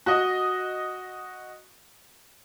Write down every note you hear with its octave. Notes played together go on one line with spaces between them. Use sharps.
F#4 D#5